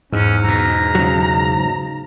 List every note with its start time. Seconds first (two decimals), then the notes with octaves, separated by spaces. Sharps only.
0.12 E2 G#2 C#4
0.44 E2 B2 A#5
0.95 C#3 F#3